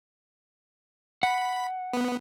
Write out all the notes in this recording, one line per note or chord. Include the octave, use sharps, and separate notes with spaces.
F#5 B5
B3